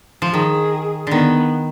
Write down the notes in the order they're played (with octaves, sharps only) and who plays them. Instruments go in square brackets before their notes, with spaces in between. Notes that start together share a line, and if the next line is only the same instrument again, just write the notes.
[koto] F3
[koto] D#3 [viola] G#4
[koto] D3 D#3 [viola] B3